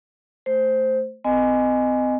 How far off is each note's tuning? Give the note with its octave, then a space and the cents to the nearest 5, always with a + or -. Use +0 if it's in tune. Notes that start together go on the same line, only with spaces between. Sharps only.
A3 +0 C5 +0
C4 -35 D#5 -15 G#5 +0